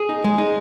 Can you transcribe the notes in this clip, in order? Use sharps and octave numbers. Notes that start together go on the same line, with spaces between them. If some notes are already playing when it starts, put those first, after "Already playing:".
Already playing: G#4
D#4
G#3
D#4